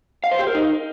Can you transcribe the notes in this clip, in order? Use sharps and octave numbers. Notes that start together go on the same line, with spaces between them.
F5
C5
G4
A#4
D#4